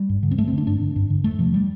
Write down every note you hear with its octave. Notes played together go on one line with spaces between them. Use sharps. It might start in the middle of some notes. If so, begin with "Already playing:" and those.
Already playing: G3
G2
D3
C4
G2 A3
C4
D3 D4
G2 D4
D3
G2
D3
F2 A3
C3 F3
G3